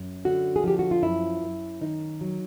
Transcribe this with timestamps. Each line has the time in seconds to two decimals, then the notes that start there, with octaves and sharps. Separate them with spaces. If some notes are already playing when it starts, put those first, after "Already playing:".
Already playing: F#2
0.25 D3 F#4
0.56 G#4
0.64 F3 G4
0.79 F#4
0.91 F4
1.02 F#2 E4
1.42 F#2
1.81 D#3 D#4
2.21 F#3